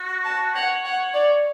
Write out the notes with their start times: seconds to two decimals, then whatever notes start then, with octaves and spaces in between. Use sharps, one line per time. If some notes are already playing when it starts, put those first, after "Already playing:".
Already playing: F#4
0.24 A5
0.55 C#5 F#5
0.85 F#5
1.14 D5